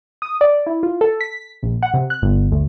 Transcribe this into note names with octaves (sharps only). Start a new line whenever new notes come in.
D#6
D5
E4
F4
A4
B6
A#1
F#5
C3
F#6
G1
D2